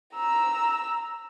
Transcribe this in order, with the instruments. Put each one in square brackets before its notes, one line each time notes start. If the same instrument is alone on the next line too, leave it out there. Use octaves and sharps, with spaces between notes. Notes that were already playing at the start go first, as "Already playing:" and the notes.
[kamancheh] A#5 E6